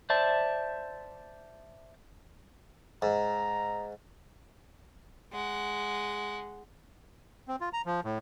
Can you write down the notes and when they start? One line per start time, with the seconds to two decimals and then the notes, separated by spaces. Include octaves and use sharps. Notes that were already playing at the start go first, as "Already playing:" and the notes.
0.10 C5 D5 E5 A5
3.02 G#2 A#5
5.32 G#3 F#5
7.48 C4
7.61 F4
7.73 A#5
7.86 F3
8.04 A2